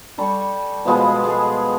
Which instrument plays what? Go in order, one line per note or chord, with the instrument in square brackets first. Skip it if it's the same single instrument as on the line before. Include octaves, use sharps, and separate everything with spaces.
[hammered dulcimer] G3 A4 C#6
B2 F3 G#3 B3
G#3 G#4 A4